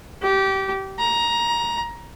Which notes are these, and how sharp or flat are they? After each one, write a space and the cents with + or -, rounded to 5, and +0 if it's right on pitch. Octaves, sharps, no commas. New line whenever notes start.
G4 -20
A#5 +15